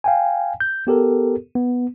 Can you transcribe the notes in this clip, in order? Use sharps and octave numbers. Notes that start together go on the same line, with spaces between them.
F5 G5 G#5
G6
B3 G4 A4 A#4
B3